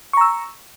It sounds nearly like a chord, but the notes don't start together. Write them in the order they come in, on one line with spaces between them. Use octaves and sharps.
C#6 A#5 E6